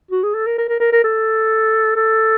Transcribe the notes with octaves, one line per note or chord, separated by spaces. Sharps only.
F#4
G#4
A4
A#4
A#4
A#4
A#4
A#4
A4
A4